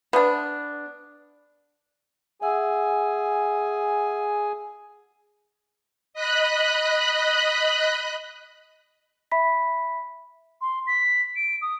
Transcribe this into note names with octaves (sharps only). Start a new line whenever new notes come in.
B3 D4
G#4 E5 F#5 G#5 E6
D#5 B5 F#6
E5 B5 B6
C6
B6
D7
D#6